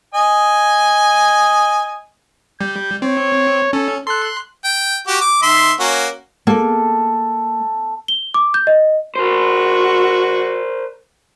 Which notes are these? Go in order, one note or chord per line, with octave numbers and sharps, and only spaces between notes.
D#5 G#5
G3 G6
C4 C#5
C#4 A4
A4 C6 F#6
G5
F#4 G4
D6
D#3 E5 C6
A#3 C#4 F#4
A#3 A4
G7
D6
G6
D#5
F#4 A#4 C5